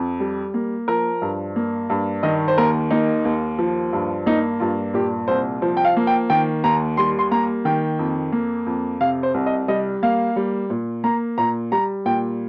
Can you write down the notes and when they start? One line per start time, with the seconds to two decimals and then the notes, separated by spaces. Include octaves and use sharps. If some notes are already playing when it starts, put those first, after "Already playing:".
Already playing: F2
0.20 G3
0.54 A#3
0.88 F3 A#4
1.22 G2
1.56 A#3
1.90 G2
2.23 D#3 D#5
2.48 C5
2.58 D#2 A#4
2.91 A#3 D#4
3.25 D#2
3.59 F3
3.93 G2
4.26 A#3 D#4
4.60 G2 F4
4.94 A#2 G4
5.28 C2 C5
5.62 F3 C5
5.77 G5
5.85 F5
5.97 A#3
6.07 G5
6.30 D#3 G5
6.64 D#2 A#5
6.97 G3 C6
7.19 C6
7.31 A#3 A#5
7.65 D#3 G5
7.99 F2
8.32 A#3
8.67 F2
9.01 C3 F5
9.23 C5
9.34 C2
9.46 D#5
9.68 G3 D#5
10.03 A#3 F5
10.36 G3
10.70 A#2
11.04 A#3 A#5
11.38 A#2 A#5
11.72 G3 A#5
12.05 A#2 G5